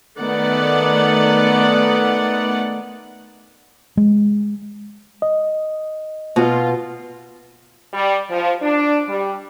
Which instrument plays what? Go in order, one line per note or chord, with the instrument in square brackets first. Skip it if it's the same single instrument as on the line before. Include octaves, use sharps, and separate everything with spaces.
[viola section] D#3 A3 B3 D5 F#5
[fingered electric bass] G#3
[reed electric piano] D#5
[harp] B2 [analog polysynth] F4
[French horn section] G3
F3
D4
G3